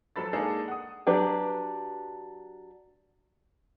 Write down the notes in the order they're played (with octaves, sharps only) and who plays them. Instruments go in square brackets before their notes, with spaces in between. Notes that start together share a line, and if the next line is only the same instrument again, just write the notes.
[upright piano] F2 F#3 A4 B5 A6
G#3 A#3 D4 D#4 G#4 A4
F#5 D#6
[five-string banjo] F#3 D4 G4 B4